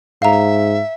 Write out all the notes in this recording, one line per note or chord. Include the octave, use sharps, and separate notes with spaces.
G#2 E5 F5 A#5